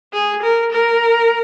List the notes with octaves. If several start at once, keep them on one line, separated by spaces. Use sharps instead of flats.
G#4
A#4
A#4